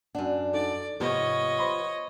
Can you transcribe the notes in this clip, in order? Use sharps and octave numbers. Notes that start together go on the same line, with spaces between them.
F#2 D4 F#5
D#4 A4 D5
G#2 C3 F3 B3 G4 C#5 D#5
C5 B5 C6